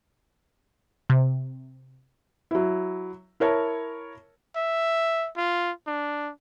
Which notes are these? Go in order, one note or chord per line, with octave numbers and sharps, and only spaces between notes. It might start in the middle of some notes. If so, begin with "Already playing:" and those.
C3
F#3 E4
E4 A#4 C#5 A5
E5
F4
D4